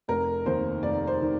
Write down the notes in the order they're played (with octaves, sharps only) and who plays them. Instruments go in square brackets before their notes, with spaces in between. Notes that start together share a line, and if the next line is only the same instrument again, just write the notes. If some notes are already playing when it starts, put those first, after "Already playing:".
[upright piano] F1 A#4
D#2 D#3 C5
F1 D5
C5
D#3